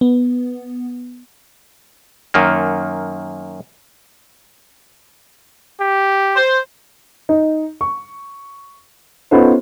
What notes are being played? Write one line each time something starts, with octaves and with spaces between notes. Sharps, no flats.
B3
F#2 D#3 A#3
G4
C5
D#4
C#6
B3 C#4 D#4 F4 A4 C5